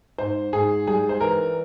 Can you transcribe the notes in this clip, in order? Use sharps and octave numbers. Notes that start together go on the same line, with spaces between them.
G#2 C5
G#2 G#4
G3 G#4
C5
E3 A#4